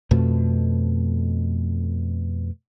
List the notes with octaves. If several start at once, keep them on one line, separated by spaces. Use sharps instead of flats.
F2 B2 A3